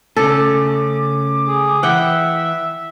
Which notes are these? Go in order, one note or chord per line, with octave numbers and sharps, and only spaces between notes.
C#3 A3 C#4 A4 D6
G#4
E3 E5 F#5 G5